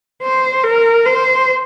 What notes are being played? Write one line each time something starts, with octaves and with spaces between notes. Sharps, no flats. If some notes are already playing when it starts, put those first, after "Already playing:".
C5
A#4
C5